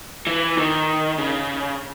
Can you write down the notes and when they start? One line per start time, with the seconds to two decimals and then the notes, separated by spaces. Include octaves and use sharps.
0.27 E3
0.58 D#3
1.18 C#3